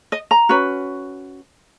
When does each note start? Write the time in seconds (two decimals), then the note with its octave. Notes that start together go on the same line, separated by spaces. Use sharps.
0.12 D#5
0.31 A#5
0.49 C#4 F#4 B4